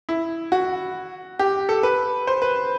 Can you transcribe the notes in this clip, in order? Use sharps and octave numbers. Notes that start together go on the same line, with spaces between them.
E4
F#4
G4
A4
B4
C5
B4